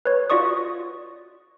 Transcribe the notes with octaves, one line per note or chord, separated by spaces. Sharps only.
B4 C#5
F4 F#4 D5 C#6 D#6